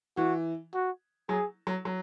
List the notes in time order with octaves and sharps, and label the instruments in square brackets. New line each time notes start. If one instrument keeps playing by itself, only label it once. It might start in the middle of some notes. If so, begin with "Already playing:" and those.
[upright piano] E3 [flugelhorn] F#4
[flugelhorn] F#4
[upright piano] F#3 [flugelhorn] G#4
[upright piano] F#3
F#3